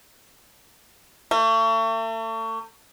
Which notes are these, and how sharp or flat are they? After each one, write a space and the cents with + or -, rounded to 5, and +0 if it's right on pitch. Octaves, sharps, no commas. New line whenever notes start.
A3 +40